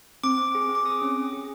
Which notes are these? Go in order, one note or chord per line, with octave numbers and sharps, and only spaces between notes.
C4 D6
C4
G#4
C4
D6
G#4 D#6
C#4
C#4
G#4